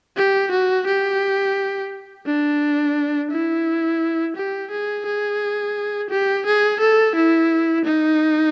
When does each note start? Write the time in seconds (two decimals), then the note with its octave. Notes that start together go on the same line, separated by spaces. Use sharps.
0.17 G4
0.51 F#4
0.87 G4
2.26 D4
3.31 E4
4.36 G4
4.71 G#4
5.06 G#4
6.10 G4
6.46 G#4
6.80 A4
7.15 E4
7.85 D#4